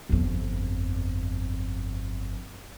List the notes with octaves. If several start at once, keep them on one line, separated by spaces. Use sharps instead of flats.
G1 F2